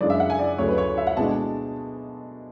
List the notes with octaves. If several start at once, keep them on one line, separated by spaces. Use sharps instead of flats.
F#2 C#3 G#3 D4 D5
E5
F#5
G#5
D5
D2 C#3 F#3 A3 C#5
B4
C#5
E5
F#5
B2 G#3 D4 A5